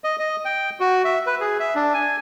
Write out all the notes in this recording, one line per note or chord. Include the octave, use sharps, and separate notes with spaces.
D#5
D#5
G5
F#4
E5
B4
G#4
E5
D4
G#5